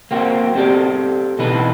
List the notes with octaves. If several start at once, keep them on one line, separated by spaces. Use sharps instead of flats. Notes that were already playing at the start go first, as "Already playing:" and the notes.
A#3 C4 F#4
C4 G4 A4 D5
B2 E3 B3 D#4 A4 B4